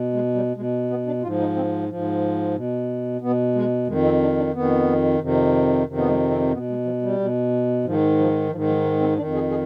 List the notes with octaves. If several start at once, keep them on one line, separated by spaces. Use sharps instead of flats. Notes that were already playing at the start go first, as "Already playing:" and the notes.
Already playing: B2
G#3
G3
B2 G#3
B3
D4
G#2 F3 F4
D#4
C4
G#2 F3
B2
B2 B3
G#3
F2 D#3 G#3
C4
D4
D4
F2 D#3 B3
F2 C3 D#3
F2 C3 D#3
B3
G#3
C4
B2 B3
G#3
F3
G3
B2
G#2 D#3 F3
F3
G#2 D#3 F3
F3
G#3
C4
F2 D#3 D4
G#4
G#4